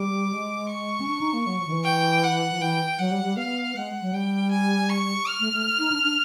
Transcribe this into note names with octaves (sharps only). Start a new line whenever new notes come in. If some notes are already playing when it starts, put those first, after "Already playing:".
Already playing: G3 D6
G#3
C#6
C#4
D4
D#4
A#3
F#3
F3
D#3
E3
G5
F#5
F3
E3 G5
F#3 F#5
G3
G3
B3 F5
G#3 F#5
F#3
G3 G5
G#5
C#6
F6
A3
A3
D#4
D4
D4